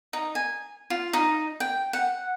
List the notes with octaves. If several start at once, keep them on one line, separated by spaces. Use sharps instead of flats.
D#4
G#5
F4
D#4
G5
F#5